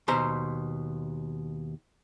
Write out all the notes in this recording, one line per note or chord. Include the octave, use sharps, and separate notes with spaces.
D#2 B2 C5 A#5